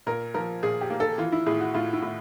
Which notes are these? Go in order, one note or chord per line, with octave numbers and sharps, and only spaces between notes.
A#2 A#4
F3 A#4
A#2 G#4
G4
A#3
A4
E3 F4
E4
A2 G#4
F#4
A2 F4
E4
A2